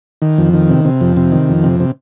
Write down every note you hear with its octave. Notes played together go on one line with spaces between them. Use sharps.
D#3
F2
D#3
C3
C3
F2
C3
D#3
F2
C3
C3